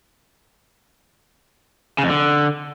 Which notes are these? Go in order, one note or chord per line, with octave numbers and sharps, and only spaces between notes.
C#3
F2
D3